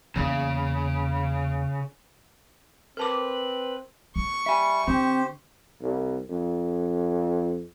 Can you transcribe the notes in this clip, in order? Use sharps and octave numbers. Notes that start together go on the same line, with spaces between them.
E2 C#3 A#3
C4 A#4 B4 A5 D6
A#3 C#6
G3 E5 G#5
D3 C4 G4 C5
C2
F2